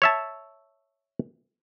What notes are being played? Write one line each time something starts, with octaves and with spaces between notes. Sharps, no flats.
C#5 E5 A5